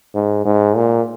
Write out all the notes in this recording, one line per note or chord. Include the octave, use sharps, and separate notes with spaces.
G#2
G#2
A#2